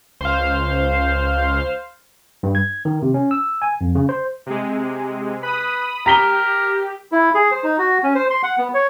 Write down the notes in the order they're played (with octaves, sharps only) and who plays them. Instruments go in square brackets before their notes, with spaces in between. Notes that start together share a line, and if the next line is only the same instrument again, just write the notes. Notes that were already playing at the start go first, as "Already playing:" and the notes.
[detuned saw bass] C#2 [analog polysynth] C5 F5
[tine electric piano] G2
G#6
D#3
C3
C#4
E6
G#5
F2
C#3
C5
[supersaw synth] C3 G#3
[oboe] B4 [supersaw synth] B5 D#6
[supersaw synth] G4 [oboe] A#4 [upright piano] A#5 B6 G7
[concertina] E4
G#4
C5
D#4
F#4
C#4
C5
C6
F#5
B3
C#5